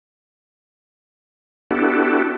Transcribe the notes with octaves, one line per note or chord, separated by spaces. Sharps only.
B3 D4 E4 F#4 G4 A4